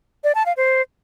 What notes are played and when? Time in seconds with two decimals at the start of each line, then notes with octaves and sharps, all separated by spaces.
0.24 D5
0.35 A5
0.46 F5
0.57 C5